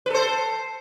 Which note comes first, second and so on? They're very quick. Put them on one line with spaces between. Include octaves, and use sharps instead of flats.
B4 A4 C5